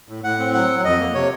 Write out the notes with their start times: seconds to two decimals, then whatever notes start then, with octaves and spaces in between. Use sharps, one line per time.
0.09 A2
0.24 A2 F#5
0.39 C4
0.54 F#3 F#5
0.69 F#3
0.85 F2 D#5
1.00 A#3
1.15 C3 C#5